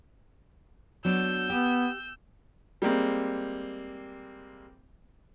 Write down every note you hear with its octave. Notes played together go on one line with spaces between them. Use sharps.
F#3 B3 D4 E6 G6
B3 G4
G3 G#3 A#3 C4